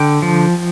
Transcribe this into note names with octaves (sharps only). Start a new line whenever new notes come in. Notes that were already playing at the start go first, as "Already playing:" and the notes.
Already playing: D3 G5
F3